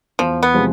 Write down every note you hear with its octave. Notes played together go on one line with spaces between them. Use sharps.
E2 F3
B3
C3 F3 G#3